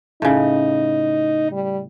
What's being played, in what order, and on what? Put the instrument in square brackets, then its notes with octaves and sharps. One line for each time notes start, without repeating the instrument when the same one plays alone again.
[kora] A2 C#3 [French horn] D#4
[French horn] G3